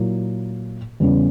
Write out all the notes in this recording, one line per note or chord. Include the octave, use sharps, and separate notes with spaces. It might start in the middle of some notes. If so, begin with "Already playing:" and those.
Already playing: A#2 F#3 A#3 E4
E2 C#3 G3 C#4